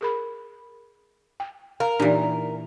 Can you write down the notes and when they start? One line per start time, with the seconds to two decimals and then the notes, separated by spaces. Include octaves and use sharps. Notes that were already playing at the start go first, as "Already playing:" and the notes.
0.01 G#4 A#4 B5
1.40 G5
1.80 A#4 F5
2.00 A#2 E3 D4 D#4 G4